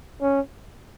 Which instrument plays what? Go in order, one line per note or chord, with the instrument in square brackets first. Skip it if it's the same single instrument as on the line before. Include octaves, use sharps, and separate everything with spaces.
[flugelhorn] C#4